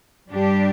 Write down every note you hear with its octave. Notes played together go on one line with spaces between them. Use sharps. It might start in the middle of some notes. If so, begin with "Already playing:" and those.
G2 G3 D4 G4